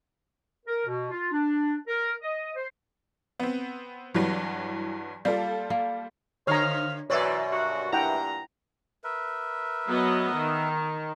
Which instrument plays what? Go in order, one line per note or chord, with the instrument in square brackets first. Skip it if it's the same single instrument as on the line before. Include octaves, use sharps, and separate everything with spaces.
[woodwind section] A#4
B2
F4
D4
A#4
D#5
C5
[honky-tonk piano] B3 C4
[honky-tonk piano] G2 E3 F#3 [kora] G3
[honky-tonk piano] G3 F4 A4 [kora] A#3
[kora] A#3
[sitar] D3 [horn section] D#4 C5 F5 [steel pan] C#5 A#5
[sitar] F#2 B2 D5 [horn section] E3 [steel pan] C#5 E5
[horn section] G2 F#4
[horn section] G2 A#2 A#5 [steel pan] E4 F#5 G5
[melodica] A#4 B4 E5
[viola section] F#3 B3 D#5
D#3